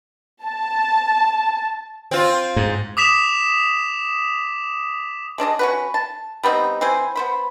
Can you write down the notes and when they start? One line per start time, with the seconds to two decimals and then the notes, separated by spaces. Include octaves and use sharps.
0.45 A5
2.11 C4 F4
2.56 G#2
2.97 D6 D#6 B6 E7 F7
5.38 G#3 D4 D5 D#5
5.59 C#4 F#4 B4
5.94 A5
6.43 G3 B3 C4 D#4
6.81 E3 C4 C5 G#5
7.16 B3 C5 B5